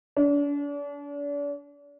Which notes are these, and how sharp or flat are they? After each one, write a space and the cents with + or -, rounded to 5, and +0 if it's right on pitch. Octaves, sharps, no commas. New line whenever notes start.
D4 -40